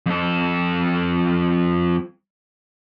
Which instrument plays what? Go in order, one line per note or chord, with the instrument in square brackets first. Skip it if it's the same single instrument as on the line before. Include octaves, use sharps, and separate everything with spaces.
[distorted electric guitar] F2 A4